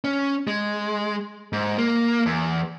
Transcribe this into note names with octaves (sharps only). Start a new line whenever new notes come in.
C#4
G#3
G#2
A#3
E2